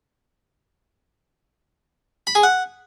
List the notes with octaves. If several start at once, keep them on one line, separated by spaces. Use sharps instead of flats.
B5
G#4
F#5